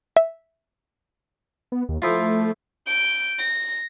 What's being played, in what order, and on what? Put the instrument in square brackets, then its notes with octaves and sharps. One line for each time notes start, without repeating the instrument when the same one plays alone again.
[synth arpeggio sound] E5
[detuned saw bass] B3
D#2
[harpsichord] F3 E4 F4 [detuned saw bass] A3
[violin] G6 D7
A#6